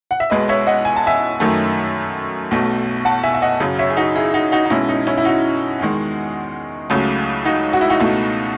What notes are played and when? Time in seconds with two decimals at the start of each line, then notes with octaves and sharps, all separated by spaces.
0.11 F#5
0.20 E5
0.30 B1 B2 G#3 B4 D#5
0.49 C#5 E5
0.67 D#5 F#5
0.85 G#5
0.96 A5
1.07 E5 G#5
1.40 F#2 D#3 F#3 A3
2.51 B1 B2 A3
3.05 F#5 A5
3.23 E5 G#5
3.34 E5
3.42 D#5 F#5
3.60 F#2 C#3 F#3
3.79 C#5 E5
3.90 G#4
3.97 D#4 F#4
4.16 E4 G#4
4.34 D#4 F#4
4.52 D#4 F#4
4.65 D#4
4.70 B1 B2 G#3 C#4 E4
4.89 D#4
5.07 C#4 E4
5.18 E4
5.25 D#4 F#4
5.80 E2 D#3 G#3
6.90 C#2 C#3 F#3 A3
7.45 D#4 F#4
7.73 F#4
7.81 E4
7.90 D#4 F#4
8.00 C#2 B2 A3